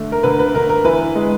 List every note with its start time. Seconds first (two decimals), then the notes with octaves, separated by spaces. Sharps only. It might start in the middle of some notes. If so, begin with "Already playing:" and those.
Already playing: D3 A3
0.12 A#4
0.23 D3 B4
0.39 B4
0.54 D3 A#4
0.69 A#4
0.85 E3 B4
1.15 G#3